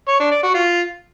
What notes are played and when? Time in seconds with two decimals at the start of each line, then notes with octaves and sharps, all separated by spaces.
0.08 C#5
0.20 D4
0.31 D5
0.43 F#4
0.54 F4